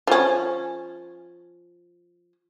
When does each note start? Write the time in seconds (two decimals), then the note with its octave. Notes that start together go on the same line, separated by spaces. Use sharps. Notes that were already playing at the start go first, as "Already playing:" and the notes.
0.07 F3 C#4